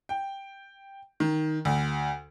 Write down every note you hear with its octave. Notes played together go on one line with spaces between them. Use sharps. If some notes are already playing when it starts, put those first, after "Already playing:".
G5
D#3
D2